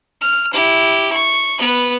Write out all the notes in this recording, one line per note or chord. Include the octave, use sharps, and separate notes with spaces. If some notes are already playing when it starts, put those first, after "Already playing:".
F6
E4 G4
C#6
B3 B4